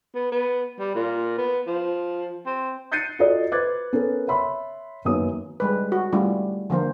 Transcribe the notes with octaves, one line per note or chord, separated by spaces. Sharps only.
B3
B3
G3
A#2
B3
F3
C4
F#6 G6 A6 C7 C#7 D#7
F4 F#4 A4 D5 D#5
B4 C5 D6 F#6 G#6 A6
B3 C#4 A4 A#4
C#5 E5 B5 C6
F#2 D#3 A#3 B3 D#4 D#6
G3 G#3 B4
F#4
G3 A3 C#4 E4 F4
D3 F3 A#3 C5